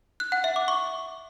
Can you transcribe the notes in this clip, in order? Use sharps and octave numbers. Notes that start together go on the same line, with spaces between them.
F#6
F#5
E5
D6
C#6